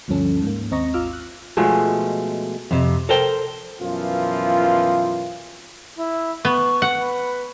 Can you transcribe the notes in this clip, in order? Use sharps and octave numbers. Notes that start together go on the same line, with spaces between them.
D2 G2 F3 C#4 A4
G#2 A#3
D#2 C4 D#5 A#5 C#6 A#6
G#1 F4 D6 E6 F6
F#6
B2 F3 G#3 A3
F2 C3
A4 A#4 C5 G5
F#2 B2 E3 F3 F4
E4
B3 C#6
F#5
B4